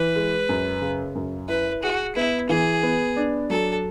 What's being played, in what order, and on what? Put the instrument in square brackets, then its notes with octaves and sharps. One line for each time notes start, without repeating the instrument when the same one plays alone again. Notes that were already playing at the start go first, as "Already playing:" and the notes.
Already playing: [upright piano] E3 [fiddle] B4
[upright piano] G#3
F#2
C#3
F#2
[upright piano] E4 [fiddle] B4
[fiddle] F#4 [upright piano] G#4
[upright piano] B3 [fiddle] E4
[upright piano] E3 [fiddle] G#4
[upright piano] B3
D4
[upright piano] F#3 [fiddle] A4